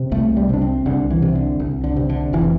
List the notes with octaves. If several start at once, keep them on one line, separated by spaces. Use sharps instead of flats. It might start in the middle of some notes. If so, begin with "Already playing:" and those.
Already playing: C3
C2 A3
G3
C3 D4
C4
C2 D3
E3
C3
D3
C2
D3
C3
D3
F1 E3